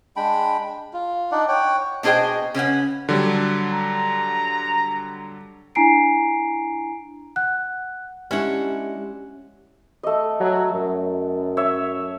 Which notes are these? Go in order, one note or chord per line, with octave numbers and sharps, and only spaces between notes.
G#3 D4 G5 B5
F4
D4 D#4 D5 F#5
C#5 F#5 G5
B2 D4 G#4 C5 D#5 G5
C#3 C#4 B4 F#5
D3 F#3 G3
A#5
D4 E4 G#5 A#5 C7 D7
F#5 F#6
G#3 C#4 D4 E4 G4 F#5
A3 D#5
F#3
F#2
C#5 E5